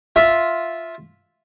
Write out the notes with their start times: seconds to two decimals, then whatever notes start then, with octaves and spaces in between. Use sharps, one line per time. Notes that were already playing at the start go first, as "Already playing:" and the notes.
0.16 F4 E5